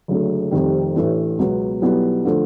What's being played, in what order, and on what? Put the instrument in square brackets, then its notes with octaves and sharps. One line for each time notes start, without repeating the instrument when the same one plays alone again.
[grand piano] F#1 F#2 D3 F#3 A3
F1 F2 C3 D#3 G3
A1 A2 E3 A3 D4
C#2 B2 F#3 B3
B1 B2 G3 B3 E4
D3 F3 A3